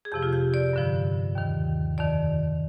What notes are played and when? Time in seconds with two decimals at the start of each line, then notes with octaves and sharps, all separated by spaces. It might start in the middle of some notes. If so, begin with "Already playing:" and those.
0.05 G#4
0.12 F2 C3 F3 G4
0.23 F4
0.33 G4
0.54 D5
0.73 G2 D3 F3
1.35 D#2 D#3
1.98 F2 D#3 D5